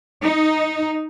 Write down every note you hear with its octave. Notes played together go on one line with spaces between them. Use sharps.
D#4